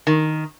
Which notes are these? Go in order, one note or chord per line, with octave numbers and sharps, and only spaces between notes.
D#3